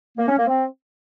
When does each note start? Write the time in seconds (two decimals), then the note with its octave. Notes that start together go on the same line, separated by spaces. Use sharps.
0.18 A#3
0.27 C#4
0.37 A#3
0.47 C4